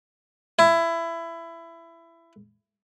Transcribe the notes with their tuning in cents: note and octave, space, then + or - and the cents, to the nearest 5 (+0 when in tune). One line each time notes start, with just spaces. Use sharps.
E4 +20